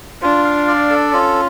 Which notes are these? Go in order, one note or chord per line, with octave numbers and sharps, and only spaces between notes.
D4 F4
F5
D5
A4
C#4 F4